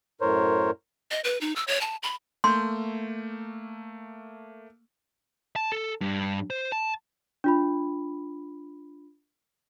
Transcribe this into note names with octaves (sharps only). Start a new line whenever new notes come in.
F#2 A2 A#4 C5 C#5
D#5
B4
D#4
E6
C#5
A5
B5
A3 A#3 C6 G6
A5
A4
G2
C5
A5
D4 F4 B5